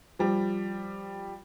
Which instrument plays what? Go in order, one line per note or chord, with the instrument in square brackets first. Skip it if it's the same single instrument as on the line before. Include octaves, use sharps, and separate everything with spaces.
[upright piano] F3 G3